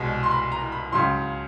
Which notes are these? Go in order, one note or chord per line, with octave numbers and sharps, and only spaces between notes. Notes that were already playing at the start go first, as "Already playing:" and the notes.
Already playing: C2 B2 G#3
C6
B5
A#5
B5
C#2 C#3 F#3 C6